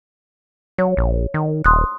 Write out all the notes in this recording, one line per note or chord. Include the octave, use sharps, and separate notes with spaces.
F#3 C#5
A#1
D#3
D#1 C6 D#6 F#6